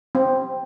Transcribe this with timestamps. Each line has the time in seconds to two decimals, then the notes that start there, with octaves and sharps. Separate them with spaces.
0.15 C4